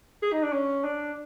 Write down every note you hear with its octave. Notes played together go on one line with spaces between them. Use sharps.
G#4
D#4
D4
C#4
D4